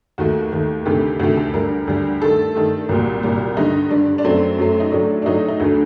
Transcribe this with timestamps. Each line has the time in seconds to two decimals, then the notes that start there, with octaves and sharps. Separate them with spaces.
0.18 D#2 D#3 A3 F#4
0.52 D#2 D#3 A3
0.86 D2 C3 D#3 A3 G4
1.20 D2 C3 D#3 A3 F#4
1.37 A4
1.53 D2 D3 G3 A#4
1.87 D2 D3 G3
2.21 G2 D#3 A3 A4
2.55 G2 D#3 A3
2.89 C2 A#2 G3 F#4
3.23 C2 A#2 G3
3.57 G2 D3 G3 D#4
3.90 G2 D3 G3 D4
4.18 D4
4.25 F#2 F#3 A3 C4
4.58 F#2 F#3 A3
4.80 D#4
4.92 A2 F#3 A3 D4
5.22 D4
5.26 A2 F#3 A3 D#4
5.48 D#4
5.60 D2 D3 A3 F#4